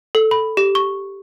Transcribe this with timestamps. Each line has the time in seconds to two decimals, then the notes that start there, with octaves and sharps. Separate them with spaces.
0.15 A4
0.31 B5
0.57 G4
0.75 C#6